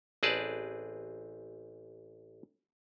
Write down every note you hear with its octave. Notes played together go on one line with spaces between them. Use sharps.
A1 C4 G#4 B4 D5 A5